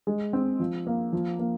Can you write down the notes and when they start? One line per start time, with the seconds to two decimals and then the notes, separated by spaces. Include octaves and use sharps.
0.07 G#3
0.33 C4
0.60 F3
0.87 A#3
1.12 F3
1.39 A#3